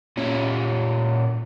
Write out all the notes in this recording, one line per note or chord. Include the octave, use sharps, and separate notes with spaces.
A#2 C#4